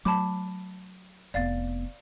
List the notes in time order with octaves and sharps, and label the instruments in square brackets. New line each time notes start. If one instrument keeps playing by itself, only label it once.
[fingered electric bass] F#3 A3 [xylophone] A5 B5 D6
[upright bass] F1 B3 [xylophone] D5 F5 A6